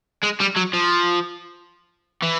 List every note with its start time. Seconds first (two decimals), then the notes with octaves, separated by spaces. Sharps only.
0.23 G#3
0.40 G3
0.56 F#3
0.73 F3
2.22 E3